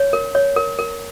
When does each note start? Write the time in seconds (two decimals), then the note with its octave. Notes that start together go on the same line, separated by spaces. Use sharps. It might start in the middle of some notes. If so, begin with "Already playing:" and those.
Already playing: C#5
0.13 A#4
0.35 C#5
0.56 A#4
0.79 A#4